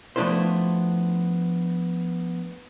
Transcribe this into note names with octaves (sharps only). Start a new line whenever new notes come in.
F3 A3 B3 D4 E4 C5